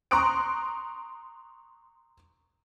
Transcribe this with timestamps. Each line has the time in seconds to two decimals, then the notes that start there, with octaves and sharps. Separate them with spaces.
0.11 A#5 C6 C#6 D#6 F#6 D7